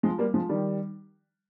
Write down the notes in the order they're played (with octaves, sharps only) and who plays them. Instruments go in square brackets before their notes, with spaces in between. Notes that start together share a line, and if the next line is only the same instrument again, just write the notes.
[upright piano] F3 G#3
G3 A#3
F3 G#3
D#3 G3